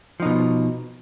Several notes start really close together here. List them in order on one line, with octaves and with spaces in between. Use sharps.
F3 D#4 B2